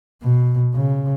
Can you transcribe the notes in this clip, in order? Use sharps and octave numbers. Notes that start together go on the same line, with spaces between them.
B2
C#3